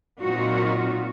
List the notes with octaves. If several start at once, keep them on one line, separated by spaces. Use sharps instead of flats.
A#2 F#3 C4 D#4 F4 F#4